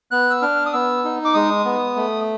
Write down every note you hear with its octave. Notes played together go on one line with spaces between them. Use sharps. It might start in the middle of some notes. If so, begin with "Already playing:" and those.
B3 F#6
E6
D4 F6
D#6
B3 E6
D#4
D6
G#3 D#6
B3
A3